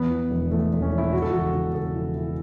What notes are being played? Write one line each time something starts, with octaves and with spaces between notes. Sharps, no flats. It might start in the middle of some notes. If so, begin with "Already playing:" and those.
Already playing: E2 B3
E3
E1
E3 A3
E1
C#4
E3
E4
C#3 F#4
A4
E1 F#4
C#3
C#3 A4
E3
E3